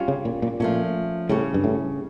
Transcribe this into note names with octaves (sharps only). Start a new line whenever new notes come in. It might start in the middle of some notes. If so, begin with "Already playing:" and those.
Already playing: G3 C#4 F4
C#3
A#2
A#2
A#2 F3 A3 C#4
A2 C#3 G3 C#4
G2
A2